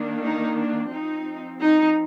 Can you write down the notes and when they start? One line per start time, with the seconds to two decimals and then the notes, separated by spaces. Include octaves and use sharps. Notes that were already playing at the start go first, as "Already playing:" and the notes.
Already playing: D#3 A#3 D4
0.24 D#4
0.58 D4
0.93 F3 C4 D#4
1.62 D#4